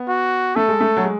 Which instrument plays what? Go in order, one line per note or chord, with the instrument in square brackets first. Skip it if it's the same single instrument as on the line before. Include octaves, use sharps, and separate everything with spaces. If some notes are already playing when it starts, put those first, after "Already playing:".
Already playing: [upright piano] B3
[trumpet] F#4
[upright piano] A3 [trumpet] A4
[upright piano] G#3
A3
F#3
G#3